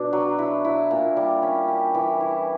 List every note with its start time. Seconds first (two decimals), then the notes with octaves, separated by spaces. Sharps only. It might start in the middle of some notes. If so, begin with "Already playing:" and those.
Already playing: B2 D4
0.13 F#3
0.39 E4
0.65 E4
0.91 A#2
1.17 G3
1.43 C#4
1.68 G4
1.95 E3
2.20 E4